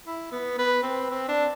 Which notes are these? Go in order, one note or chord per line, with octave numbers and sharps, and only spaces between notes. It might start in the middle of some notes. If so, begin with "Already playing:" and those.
E4
B3
B4
C4
C4
D4